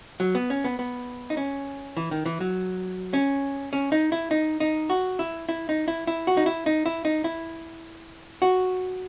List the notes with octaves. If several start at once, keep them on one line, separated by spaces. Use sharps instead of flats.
F#3
B3
C#4
B3
B3
D#4
C#4
E3
D#3
E3
F#3
C#4
C#4
D#4
E4
D#4
D#4
F#4
E4
E4
D#4
E4
E4
F#4
D#4
E4
D#4
E4
D#4
E4
F#4